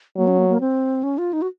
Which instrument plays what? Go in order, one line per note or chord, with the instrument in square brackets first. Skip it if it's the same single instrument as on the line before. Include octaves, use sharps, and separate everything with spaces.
[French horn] F#3 [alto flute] A#3
[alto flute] C#4
A#3
A#3
C4
C#4
F4
D#4
F#4